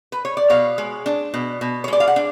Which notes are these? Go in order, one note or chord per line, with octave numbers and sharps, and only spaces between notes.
B4
C#5
D5
B2 C#5 F5
G#3
D4
B2
B2
C#5
G#3 D5
F5
F#5
D4